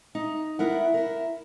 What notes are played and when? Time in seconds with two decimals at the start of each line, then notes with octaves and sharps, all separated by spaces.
0.15 D#4
0.59 B3 E4 A#4 F#5
0.94 E4 A#4